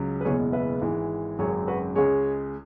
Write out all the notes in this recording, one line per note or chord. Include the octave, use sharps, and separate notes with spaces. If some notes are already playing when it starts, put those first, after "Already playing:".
Already playing: C#2 C#3 F#3
B4
F#1 E2 B2 G#3 G#4 C#5
B4 E5
G#1 G#2 E3 G#3
G#1 F#2 C#3 F#3 G#4 C#5
F#4 B4
C#2 C#3 G#3 G#4 C#5